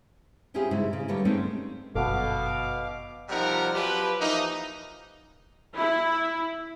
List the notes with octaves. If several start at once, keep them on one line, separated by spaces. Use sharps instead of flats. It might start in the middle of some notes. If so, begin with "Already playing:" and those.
C4 C#4 E4 F4 G4 G#4
G#2 C#3 E4
C#3
D3 G3 A#3 B3 A4 C#5
G#3 A3 C4 C#4 D#4
G1 F#2 B2 A4 F5 F#5 D6
C3 F3 G3 D#4 A#4 F#5
F3 F#3 G4 B4
E3 F3 A#3 D#4
E4